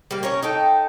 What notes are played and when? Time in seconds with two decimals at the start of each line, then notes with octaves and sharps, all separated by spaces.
0.11 G3 A#3
0.23 C#4 A#4 C#5
0.42 D#4 A4 G5